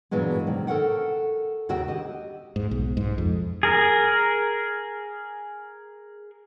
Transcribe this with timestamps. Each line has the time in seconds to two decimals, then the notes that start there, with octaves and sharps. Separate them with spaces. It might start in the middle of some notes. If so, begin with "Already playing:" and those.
0.11 G2 A#2 E3 F#3 G#3 B3
0.47 C3 D#3
0.67 A4 A#4 C#5 F#5 G5
1.69 D#2 C#3 F#4 G4 E5 G5
1.88 G4 D#5
2.56 G#2
2.71 B1
2.97 G#2
3.18 F2
3.63 G#4 A#4